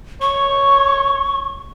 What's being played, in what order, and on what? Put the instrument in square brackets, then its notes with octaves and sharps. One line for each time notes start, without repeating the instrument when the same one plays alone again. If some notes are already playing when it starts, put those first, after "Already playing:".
[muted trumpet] C#5 [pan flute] C#6